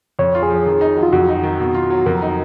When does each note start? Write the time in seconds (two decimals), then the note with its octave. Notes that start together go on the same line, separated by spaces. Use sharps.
0.19 F2 C#5
0.35 F4
0.43 G#4
0.50 F3
0.66 D#3
0.81 D#4
0.97 F#3
1.03 F4
1.12 F2 F#4
1.28 D#4
1.43 D#3
1.59 B2
1.75 F4
1.90 F#3
2.06 F2 A#4
2.22 D#4